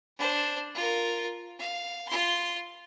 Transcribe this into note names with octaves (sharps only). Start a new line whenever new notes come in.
D4 C5
F4 A#4
F5
F4 C6